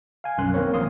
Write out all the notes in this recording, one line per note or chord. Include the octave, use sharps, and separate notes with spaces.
F5 G#5
B1 F#2 C6 F#6
D#3 A#3 C4 A#4 C#5
A#1 A#3 C6 D#6